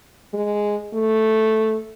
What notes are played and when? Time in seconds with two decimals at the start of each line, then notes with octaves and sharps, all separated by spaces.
0.34 G#3
0.94 A3